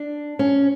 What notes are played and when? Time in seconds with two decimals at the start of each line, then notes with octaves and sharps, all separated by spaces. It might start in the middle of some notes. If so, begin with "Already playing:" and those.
Already playing: D4
0.39 C#4